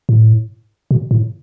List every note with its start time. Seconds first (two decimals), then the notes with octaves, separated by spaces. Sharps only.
0.09 A2
0.91 B2
1.11 A2